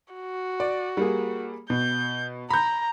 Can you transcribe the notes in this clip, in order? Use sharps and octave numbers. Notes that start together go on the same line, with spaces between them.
F#4
D5
G3 A#3 G#4
B2 G6
A#5 B5 G6